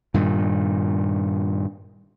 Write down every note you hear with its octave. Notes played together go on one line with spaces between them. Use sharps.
G2 A#2 D#3